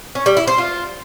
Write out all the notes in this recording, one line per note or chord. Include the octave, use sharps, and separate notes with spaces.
C#4
G3
E4
C5
F4